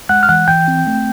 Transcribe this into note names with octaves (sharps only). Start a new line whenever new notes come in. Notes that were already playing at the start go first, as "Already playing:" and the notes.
G#3 F#5 F#6
F6
E3 F#5 F#6
E3 G5 G6
C4
A3